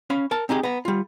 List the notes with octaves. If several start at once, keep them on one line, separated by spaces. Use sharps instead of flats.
C#4 F5 B5
A#4 A5
C4 D#4 G4 G#4
B3 A#5
G3 F4